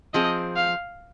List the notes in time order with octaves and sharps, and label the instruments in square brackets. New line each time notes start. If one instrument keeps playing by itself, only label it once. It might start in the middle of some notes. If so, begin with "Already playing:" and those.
[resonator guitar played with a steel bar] F3 C4 G#4 [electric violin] D#5
[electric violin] F5